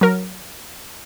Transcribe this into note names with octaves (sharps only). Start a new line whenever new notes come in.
F#3 A#4